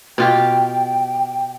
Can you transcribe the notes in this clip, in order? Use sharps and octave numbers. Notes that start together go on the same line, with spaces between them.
B2 F4 G4 G5